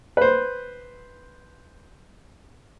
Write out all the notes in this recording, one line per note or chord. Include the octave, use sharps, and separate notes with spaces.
B4 C5